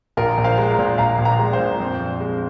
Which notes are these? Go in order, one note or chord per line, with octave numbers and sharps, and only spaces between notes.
A#1 F4 A#4
A#1
C5 F5
G#3
F5 A#5
A#2
A#1 F5 A#5
A#1
F5 A#5
G#3
C5 F5
A#2
F2
F2
G#3